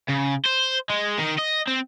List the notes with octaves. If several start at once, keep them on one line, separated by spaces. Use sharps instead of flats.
C#3
C5
G#3
D#3
D#5
C4